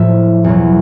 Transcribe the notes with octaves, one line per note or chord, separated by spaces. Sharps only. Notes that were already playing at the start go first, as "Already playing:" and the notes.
Already playing: A2 F3 E5
E2 B2 F#3